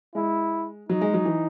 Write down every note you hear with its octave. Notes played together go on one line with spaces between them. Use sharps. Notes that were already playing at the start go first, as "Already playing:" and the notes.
G#3 E4
F#3 D#4
G#3
F#3
E3